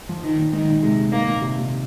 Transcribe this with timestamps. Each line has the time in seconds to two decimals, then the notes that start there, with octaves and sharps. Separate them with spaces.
0.09 F3
0.24 D#3
0.37 A#2
0.52 G#2 D#3
0.68 A#2
0.82 C3 G#3
1.11 D#3 A#3
1.27 A#2
1.42 C3
1.56 A#2